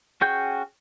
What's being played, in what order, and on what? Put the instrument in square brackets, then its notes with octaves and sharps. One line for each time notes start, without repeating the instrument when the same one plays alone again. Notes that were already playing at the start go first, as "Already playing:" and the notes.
[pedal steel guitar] C#4 F#4 G#4 G5 G6